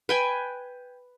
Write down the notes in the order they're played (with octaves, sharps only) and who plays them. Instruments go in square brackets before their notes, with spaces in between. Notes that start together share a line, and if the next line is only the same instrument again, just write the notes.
[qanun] B4 G5 G#5